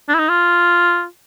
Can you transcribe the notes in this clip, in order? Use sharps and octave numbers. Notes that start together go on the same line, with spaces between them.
D4
E4
D#4
F4